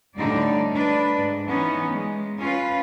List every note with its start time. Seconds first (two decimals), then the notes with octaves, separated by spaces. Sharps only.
0.16 D2 A2 D3 G3 D#4 D5
0.74 D4 B4
1.17 G#2
1.47 E3 B3 C#4 D#4
1.92 G#3
2.38 C#4 F4 B4